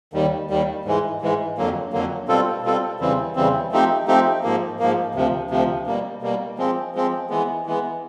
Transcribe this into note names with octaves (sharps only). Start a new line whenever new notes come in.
D#2 D#3 G3
D#2 D#3 G3
G#2 E3 G#3
G#2 E3 G#3
F2 D3 F#3 A#3
F2 D3 F#3 A#3
B2 G3 C4 F4 A4
B2 G3 C4 F4 A4
E2 C#3 E3 G3 C4
E2 C#3 E3 G3 C4
F3 A3 C4 D#4 G4
F3 A3 C4 D#4 G4
G#2 F3 A#3
G#2 F3 A#3
D2 C3 F3
D2 C3 F3
B2 G3 A#3
B2 G3 A#3
F3 G#3 C4
F3 G#3 C4
E3 G#3 B3
E3 G#3 B3